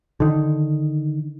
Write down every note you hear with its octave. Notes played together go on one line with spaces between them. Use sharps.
D3 D#3